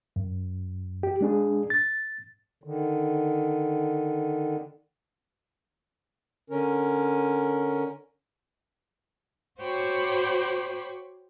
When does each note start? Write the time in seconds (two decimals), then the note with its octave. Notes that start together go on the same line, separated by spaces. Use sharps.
0.16 F#2
1.03 G4
1.21 G#3 D4 G#4
1.70 A6
2.64 D3 D#3
6.50 D3 C#4 A#4
9.60 F#4 C5 C#5 G5 B5 D6